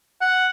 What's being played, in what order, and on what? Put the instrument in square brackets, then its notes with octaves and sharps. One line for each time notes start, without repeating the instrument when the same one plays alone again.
[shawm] F#5